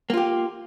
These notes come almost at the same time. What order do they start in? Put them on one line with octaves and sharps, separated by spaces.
A#3 F4 G4